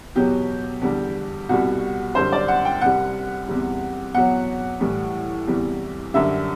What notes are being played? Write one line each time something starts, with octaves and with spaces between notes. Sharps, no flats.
E2 B2 F#3 G4
E2 D3 G3
C2 B2 G3 F#4
F#2 D3 G3 C5
D5
F#5
G5
C2 C3 G3 F#5
E2 C3 G3
E2 B2 F#3 F#5
A2 E3 G3
E2 C3 E3 G3
F#2 D3 G3 E5